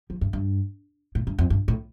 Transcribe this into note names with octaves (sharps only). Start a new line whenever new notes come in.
F3
G2
G2
A2
G2
F2
G2
A2